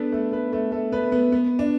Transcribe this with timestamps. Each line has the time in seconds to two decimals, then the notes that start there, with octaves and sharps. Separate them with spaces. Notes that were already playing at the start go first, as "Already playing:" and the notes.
Already playing: B3 D4 A4 B4
0.12 A3 A4
0.32 B3 B4
0.52 A3 A4
0.72 A3 A4
0.92 B3 B4
1.12 B3
1.32 B3
1.59 D4